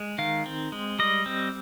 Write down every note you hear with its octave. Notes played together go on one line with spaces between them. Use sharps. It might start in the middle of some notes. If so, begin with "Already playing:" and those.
Already playing: G#3
D#3 F5
C4
G#3
G3 D#5
C4